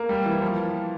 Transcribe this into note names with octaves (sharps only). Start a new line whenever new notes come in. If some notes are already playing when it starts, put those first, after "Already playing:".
Already playing: A#3
G3
E3
F3